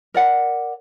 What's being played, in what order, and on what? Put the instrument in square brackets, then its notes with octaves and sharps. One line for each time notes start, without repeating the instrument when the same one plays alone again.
[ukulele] A#4 D5 F#5